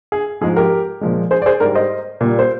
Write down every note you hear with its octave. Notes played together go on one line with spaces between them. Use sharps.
G#4
G#2 F3 G#3 G#4
G4 A#4
A#2 F3 G#3
G#4 C5
D5
G#4 C5
G#2 G3 A#4 D5
C5 D#5
A#2 G3
C5